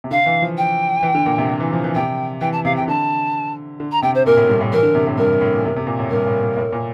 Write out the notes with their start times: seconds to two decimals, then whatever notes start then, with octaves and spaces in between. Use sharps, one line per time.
0.04 C3
0.11 D3 F5
0.26 E3
0.42 F3
0.57 G5
1.03 E3
1.15 D3
1.26 A#2
1.38 C3
1.50 C3
1.60 E3
1.73 F3
1.84 E3
1.95 C3 G5
2.41 E3 G5
2.52 A5
2.65 C3 F5
2.76 G5
2.80 C3
2.88 D3 A5
3.80 D3
3.92 A#5
4.02 C3 G5
4.15 C5
4.26 A#2 A#4
4.37 A2
4.49 G2
4.61 A2
4.72 E3 A#4
4.83 D3
4.95 C3
5.07 A2
5.18 G2 A#4
5.41 A2
5.53 A#2
5.64 C3
5.76 C3
5.87 A#2
5.99 A2
6.10 G2 A#4
6.26 A2
6.41 A#2
6.57 A2
6.72 A#2